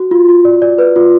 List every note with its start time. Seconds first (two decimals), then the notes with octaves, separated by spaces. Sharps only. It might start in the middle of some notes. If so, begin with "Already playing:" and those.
Already playing: F#4
0.11 F4
0.28 F4
0.45 D5
0.62 D5
0.78 B4
0.96 F4